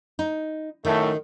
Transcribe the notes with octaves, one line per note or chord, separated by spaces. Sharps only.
D#4
F#2 A2 D#3 A3